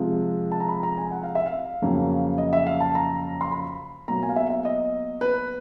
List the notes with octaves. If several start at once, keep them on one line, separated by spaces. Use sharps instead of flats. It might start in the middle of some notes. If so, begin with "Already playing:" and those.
Already playing: C3 F3 G#3
A5
A#5
B5
A#5
G#5
F#5
F5
E5
F5
F2 C#3 F#3 A#3
D#5
E5
F5
A5
A#5
C6
B5
B2 F#3 A#3 A#5
G#5
F5
E5
E5
D#5
B4